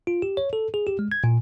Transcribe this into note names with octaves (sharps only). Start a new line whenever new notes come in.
F4
G4
C#5
A4
G#4
G4
G#3
G#6
A#2